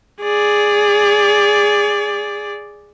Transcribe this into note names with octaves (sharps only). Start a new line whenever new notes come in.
G#4 D5